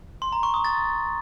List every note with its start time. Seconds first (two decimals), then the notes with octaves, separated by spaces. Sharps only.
0.22 C6
0.32 A#5
0.43 C#6
0.54 D#6
0.64 A6